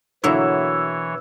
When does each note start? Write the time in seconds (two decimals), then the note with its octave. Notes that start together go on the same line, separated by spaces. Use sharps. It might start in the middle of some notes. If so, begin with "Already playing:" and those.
0.24 B2 D3 E3 F#3 A#3 E4 C#5 E5